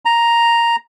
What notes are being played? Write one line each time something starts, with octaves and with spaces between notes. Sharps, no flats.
A#5